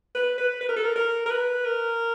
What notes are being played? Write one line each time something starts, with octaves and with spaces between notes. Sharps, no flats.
B4
B4
B4
A#4
A4
A#4
A#4
A#4
B4
A#4